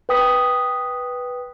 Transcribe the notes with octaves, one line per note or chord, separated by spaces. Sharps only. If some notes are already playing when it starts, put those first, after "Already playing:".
B4 G5 D#6 B6